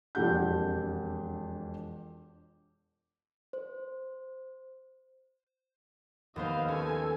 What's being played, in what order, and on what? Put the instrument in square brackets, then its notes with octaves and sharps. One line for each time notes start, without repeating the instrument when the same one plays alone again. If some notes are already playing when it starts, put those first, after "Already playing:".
[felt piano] E1 F2 D4 G4 F#5 G6
[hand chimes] C5
[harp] D#2 B3 C5 [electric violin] D#5 F5
[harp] C#4 [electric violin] A4 G#5